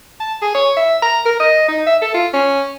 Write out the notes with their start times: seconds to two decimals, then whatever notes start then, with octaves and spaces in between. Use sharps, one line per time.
0.20 A5
0.42 G#4
0.55 C#5
0.77 E5
1.02 A#5
1.26 A#4
1.40 D#5
1.68 D#4
1.87 E5
2.02 A4
2.14 F4
2.34 C#4